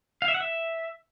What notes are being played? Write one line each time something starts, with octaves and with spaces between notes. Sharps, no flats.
F5
E5
F#5
E5